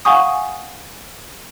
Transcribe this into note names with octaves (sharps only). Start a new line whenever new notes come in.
F5 F#5 G#5 C#6 D#6